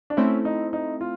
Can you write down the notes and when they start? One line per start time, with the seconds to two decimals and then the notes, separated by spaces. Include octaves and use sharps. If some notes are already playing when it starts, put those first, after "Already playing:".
0.10 D4
0.17 A3 C4 C#4 E4
0.45 D#4
0.73 D#4
1.01 F4